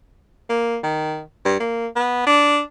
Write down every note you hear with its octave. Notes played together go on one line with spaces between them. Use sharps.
A#3
D#3
G2
A#3
B3
D4